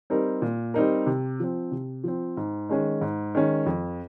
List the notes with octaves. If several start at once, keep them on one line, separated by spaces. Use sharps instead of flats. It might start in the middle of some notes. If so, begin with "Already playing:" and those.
G3 C4 D#4 A#4
A#2
G3 C4 D#4 A#4
C3
F3 C4
C3
F3 C4
G#2
D#3 G#3 C#4
G#2
D#3 G#3 C#4
F2